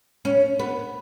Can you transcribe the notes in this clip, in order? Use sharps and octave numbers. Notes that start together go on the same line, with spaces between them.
C#4
B3